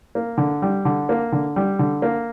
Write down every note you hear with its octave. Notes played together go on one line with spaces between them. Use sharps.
A#3
D3
G3
D3
A#3
D3
G3
D3
A#3